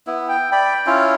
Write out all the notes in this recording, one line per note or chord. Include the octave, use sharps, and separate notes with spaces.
B3 E4
G5
D5 G5 B5
C#4 E4 F4